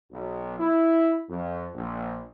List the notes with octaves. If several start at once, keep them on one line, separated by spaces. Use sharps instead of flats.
B1
E4
F2
A#1